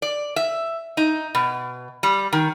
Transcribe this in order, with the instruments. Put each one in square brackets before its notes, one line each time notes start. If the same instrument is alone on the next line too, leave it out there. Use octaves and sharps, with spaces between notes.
[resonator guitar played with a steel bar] D5
E5
D#4
B2
G3
D#3